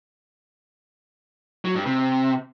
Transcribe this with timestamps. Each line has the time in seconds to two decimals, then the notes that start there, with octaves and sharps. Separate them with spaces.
1.65 F#3
1.75 G2
1.86 C3